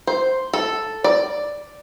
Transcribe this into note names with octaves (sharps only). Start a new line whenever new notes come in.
C5
A4
D5